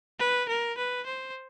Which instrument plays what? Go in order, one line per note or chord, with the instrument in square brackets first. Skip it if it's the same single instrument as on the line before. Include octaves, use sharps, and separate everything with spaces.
[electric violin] B4
A#4
B4
C5